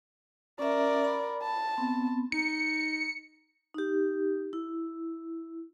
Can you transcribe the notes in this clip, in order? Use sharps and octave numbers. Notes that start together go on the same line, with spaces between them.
C#4 A#4 D5 E5
B5
A5
B3 C4
D#4 C#7
D#4 G4
E4